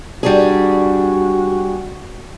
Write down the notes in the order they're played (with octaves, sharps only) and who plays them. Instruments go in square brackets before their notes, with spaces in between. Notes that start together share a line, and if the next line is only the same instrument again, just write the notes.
[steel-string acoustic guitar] G3 D4 G#4 [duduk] F#4